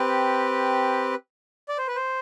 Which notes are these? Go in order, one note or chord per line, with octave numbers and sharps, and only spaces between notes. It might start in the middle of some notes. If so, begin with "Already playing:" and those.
Already playing: C4 G4 B4
D5
C5
B4
C5